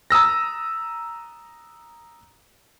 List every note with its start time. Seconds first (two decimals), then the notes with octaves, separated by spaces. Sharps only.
0.10 A#5 D#6 E6 A#6